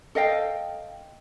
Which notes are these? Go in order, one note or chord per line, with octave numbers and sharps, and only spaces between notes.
A4 D#5 F5 G5